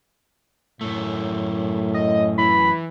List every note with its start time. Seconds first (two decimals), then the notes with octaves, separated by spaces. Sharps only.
0.81 F#2 A2 A3
1.94 D#5
2.38 E3 B5